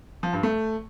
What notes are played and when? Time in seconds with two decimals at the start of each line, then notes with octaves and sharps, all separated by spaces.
0.23 F3
0.33 G2
0.43 A3